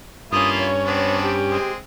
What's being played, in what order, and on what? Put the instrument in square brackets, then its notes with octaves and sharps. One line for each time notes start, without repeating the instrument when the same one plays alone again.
[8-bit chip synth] G2 C#4 [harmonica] A#3 E4 F4 [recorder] D#6
[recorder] C#5
[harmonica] B3 C4 D4
[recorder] G4
[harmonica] G#3 C4